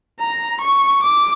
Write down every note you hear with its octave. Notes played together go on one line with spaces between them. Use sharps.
A#5
C#6
D6